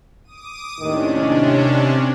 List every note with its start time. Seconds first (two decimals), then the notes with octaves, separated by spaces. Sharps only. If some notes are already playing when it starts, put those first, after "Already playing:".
0.24 D6 D#6 D#7
0.80 D#2 A2 C3 D#3 C#4 D4